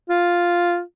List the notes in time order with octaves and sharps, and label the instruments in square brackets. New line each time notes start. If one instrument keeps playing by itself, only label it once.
[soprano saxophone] F4